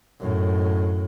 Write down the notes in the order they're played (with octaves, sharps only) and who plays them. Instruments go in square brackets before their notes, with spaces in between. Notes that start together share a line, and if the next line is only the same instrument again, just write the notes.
[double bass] F#2 A2